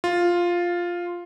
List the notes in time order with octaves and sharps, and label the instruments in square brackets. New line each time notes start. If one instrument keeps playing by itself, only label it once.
[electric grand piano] F4